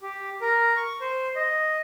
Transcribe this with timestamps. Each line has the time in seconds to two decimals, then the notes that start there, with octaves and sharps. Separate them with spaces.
0.02 G4
0.41 A#4
0.77 C#6
1.01 C5
1.36 D#5